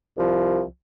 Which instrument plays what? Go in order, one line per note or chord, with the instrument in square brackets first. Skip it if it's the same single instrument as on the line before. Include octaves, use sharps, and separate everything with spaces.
[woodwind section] C2 F3